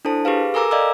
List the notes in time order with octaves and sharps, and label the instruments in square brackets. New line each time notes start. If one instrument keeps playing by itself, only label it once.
[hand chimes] D4 E4 A4 C5 A5
G4 G#4 B4 F5
A4 A#4 G#5 A#5 D6 E6
D5 D#5 F5 A#5 D6 E6